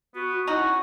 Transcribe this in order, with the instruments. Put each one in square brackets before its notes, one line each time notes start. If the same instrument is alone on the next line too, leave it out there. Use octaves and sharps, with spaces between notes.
[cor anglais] B3 [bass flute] F#4
[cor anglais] C#4 [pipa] D#4 F#4 [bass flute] E4